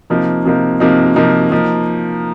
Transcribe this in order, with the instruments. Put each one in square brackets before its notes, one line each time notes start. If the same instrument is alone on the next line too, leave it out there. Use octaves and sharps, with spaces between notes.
[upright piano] C3 F3 A#3 D#4
C3 F3 A#3 D#4
C3 F3 A#3 D#4
C3 F3 A#3 D#4
F3 A#3 D#4